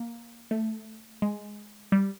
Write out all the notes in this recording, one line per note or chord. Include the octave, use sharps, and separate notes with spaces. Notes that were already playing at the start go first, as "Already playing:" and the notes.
Already playing: A#3
A3
G#3
G3